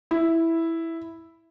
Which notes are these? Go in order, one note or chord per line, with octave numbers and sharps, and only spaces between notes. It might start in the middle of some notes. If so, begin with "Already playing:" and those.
E4